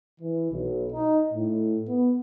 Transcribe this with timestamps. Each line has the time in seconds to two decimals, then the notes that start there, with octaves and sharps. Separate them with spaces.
0.21 E3
0.52 B1
0.92 D#4
1.34 A2
1.88 B3